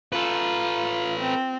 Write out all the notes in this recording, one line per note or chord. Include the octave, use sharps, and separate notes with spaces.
F4 A4 B4
C4